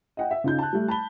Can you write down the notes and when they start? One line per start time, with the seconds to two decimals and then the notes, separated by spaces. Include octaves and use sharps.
0.17 D#5 F#5 G5
0.31 E5
0.44 C#3 D#4 F4 G6
0.59 A5 F#6
0.73 G3 A3
0.88 A5 B5 G7